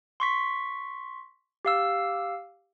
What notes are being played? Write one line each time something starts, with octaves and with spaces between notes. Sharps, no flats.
C6 C#6 B6
G4 F5 E6